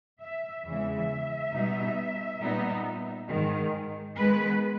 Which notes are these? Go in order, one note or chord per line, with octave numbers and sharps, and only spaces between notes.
E5
E2 C#3 E3 G#3 E5
B2 G3 B3 D#4
A#2 G3 B3 D#4
G#2 D#3 G#3
D#3 G#3 B3 B4